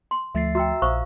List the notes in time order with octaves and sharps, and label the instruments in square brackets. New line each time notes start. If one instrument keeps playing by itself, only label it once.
[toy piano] C6
[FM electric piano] D2 F3 A3 [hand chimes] E5 A6 C7
[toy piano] F#4 G5 [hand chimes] E5 A#5 E6
[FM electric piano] A#1 [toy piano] C5 C#6 D#6 [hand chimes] F5